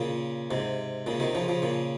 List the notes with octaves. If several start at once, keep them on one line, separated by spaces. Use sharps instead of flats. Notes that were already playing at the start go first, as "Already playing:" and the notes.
Already playing: A#2 C#3
G#2 C3
A#2 C#3
C3 D#3
C#3 F3
C#3 F3
A#2 C#3